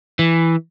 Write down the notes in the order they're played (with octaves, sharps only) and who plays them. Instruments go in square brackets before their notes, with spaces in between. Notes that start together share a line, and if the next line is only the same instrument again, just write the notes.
[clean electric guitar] E3